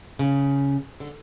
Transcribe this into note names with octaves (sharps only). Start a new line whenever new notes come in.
C#3
D3